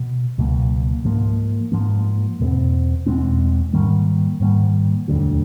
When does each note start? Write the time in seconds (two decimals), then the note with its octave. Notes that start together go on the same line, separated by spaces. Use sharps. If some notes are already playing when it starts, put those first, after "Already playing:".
Already playing: B2
0.38 C#2 B2 F#3 A#3
1.05 G#2 F3 A#3
1.72 G#2 F3 A#3
2.40 E2 B2 G#3 C4
3.06 E2 B2 G#3 C4
3.73 G#2 D#3 G3 A#3
4.40 G#2 D#3 G3 A#3
5.08 E1 D2 D3 F#3